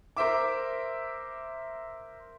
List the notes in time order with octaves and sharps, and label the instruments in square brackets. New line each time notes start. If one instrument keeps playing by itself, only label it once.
[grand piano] A#4 C5 E5 D6